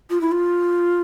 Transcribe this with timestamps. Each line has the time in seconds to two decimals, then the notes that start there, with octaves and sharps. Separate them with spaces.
0.10 F4
0.21 E4
0.32 F4